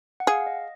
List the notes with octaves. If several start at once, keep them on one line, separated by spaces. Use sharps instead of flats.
F#5
G#4 F5
D#5